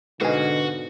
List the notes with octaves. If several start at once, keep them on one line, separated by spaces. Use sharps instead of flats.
G#2 B2 D3 F#4 B4 F5 G#5